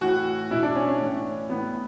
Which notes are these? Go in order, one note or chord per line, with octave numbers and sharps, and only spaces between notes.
A2 E3 F#4
B2 E4
D4
C#4
C#4
A2 E3
A2 E3 B3